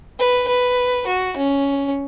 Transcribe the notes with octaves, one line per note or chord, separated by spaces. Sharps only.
B4
B4
F#4
C#4